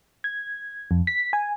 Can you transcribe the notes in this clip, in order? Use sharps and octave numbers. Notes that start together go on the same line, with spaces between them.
G#6
F2
B6
G#5